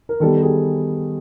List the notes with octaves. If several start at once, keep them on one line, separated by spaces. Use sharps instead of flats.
A#4
D#3 G3 B3 A4
A4
G#4